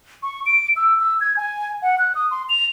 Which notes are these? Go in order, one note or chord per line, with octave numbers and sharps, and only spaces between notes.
C#6
D7
E6
E6
G#6
G#5
F#5
F#6
D#6
C6
F7